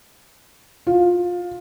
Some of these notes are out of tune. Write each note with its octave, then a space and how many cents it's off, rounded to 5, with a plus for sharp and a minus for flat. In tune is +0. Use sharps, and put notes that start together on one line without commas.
F4 +20